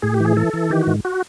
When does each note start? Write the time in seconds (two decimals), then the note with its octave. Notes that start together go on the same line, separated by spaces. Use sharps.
0.02 A2 G#4
0.14 G4
0.20 E3 G#4
0.37 E3 A4
0.54 E3
0.70 D#3 G4
0.81 F#4
0.87 G#2
1.05 F#4